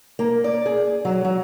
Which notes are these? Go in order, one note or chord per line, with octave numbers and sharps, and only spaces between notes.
A#3
D5
G#4
F#3
F#3